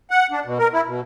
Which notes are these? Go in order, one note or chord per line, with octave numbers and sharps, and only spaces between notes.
F#5
D4
B2
A#4
E4
B2